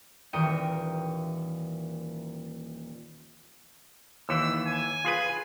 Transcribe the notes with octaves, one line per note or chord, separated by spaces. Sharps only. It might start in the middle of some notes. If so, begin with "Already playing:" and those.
D#1 E3 A#4 G5 D#6 C#7
D#2 E3 E6
G#5
F4 G#4 B4